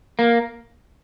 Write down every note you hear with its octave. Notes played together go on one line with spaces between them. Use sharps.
A#3